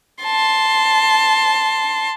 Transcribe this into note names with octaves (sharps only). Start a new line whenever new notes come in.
A5 C6